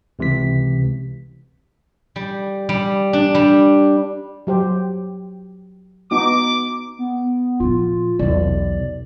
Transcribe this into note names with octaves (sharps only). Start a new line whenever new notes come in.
C#2 C3 E3 B6
G3
G3
D4
G3
F#3 G4 C5
B3 D#4 F#4 D6
B3
A#2 F3 F4
B1 E2 D5